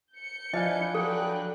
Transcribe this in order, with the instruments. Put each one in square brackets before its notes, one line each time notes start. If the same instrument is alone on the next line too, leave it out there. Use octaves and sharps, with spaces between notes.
[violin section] G6 C#7
[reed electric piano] F3 F5 G#5 [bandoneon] D4 E4 B4 [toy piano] D#5
[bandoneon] F#3 D4 B4 [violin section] F#4 G5 F#6 [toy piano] A4